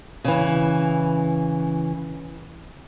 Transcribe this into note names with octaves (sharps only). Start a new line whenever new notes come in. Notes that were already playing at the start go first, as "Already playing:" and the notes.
C#3 E3